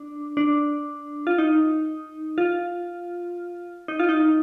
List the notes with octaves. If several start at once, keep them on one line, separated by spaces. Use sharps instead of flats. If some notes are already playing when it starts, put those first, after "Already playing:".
Already playing: D4
D4
F4
D#4
F4
D#4
F4
D#4